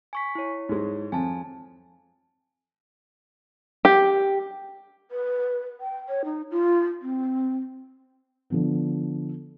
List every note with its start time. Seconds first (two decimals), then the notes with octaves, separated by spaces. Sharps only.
0.13 G#5 C#6 B6
0.35 E4 C#5
0.69 G#2 G#3
1.12 F2 G#5 A5
3.85 G4
5.10 B4
5.81 G5
6.09 C#5
6.25 D#4
6.51 F4
7.02 C4
8.50 D3 F3 B3